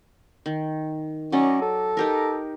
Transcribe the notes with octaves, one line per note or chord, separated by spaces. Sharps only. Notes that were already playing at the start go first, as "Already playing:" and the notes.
D#3
F#3 C#4 D5 D#5
A4
D#4 G4 A#4